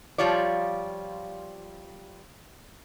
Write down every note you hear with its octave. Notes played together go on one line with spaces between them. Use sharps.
F3 G3 F4 C#5 D5